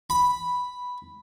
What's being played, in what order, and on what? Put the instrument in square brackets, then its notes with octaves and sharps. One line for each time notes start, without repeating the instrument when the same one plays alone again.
[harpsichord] B5